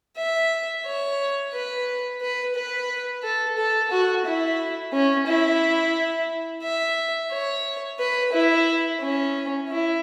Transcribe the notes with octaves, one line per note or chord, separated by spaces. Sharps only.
E5
C#5
B4
B4
B4
A4
A4
F#4
E4
C#4
E4
E5
C#5
B4
E4
C#4
E4